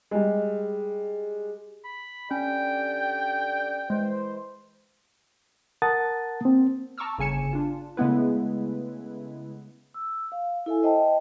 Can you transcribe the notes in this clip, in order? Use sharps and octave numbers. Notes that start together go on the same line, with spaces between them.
G3 G#3
B5
D3 C#4 G4 D5 G5
E3 G#3 C5
A#4 F#5 A5 D#6 A6
A#3 C4
A5 A#5 C#6 D6 E6 F6
G1 C#3 G#5 C#7 E7
D4 F4
C#3 G#3 A3 B3 E4 B4
E6
F5
E4 A4 E5 G#5
C5 D#5 E5 G5 A5